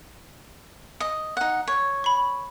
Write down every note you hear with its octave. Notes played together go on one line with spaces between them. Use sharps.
D#5
D#4 F#5
C#5
B5 C#6